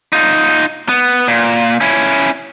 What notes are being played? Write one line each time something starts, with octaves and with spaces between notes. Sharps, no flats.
D#4 F4
B3
A#2
C#4 E4